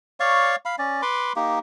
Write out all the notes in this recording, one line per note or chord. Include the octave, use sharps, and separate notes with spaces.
C#5 D5 F5 C#6
F5 B5
C#4 D5
B4 B5 C6 D6
A#3 D#4 G4